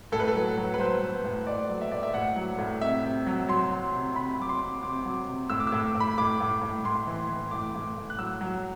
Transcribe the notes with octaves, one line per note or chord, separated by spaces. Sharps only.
A2 A4
B4
A4
F#3
F#3
B4
F#3 C5
F#3
A2
A2 D5
F#3
E5
A2 D5
E5
A2 F#5
F#3
A2
C3 E5
C3
F#3
F#3 C6
F#3
C3
C3 B5
F#3 D6
C6
C3
C3 D6
F#3
C3
A2 E6
D6
E6
A2
A2
B5
A2 D6
A2
A2
A2 C6
E3
E3
A2 D6
A2
A2
F#6
F#3 E6
F#3